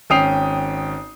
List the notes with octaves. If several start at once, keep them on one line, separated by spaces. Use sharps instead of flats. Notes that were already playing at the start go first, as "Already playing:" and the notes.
G#1 C#4 G5 D#6 C7 F7